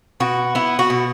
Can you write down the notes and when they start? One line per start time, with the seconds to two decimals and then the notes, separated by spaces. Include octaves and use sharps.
0.20 B2 F#4
0.55 B3 E4
0.79 F#4
0.90 B2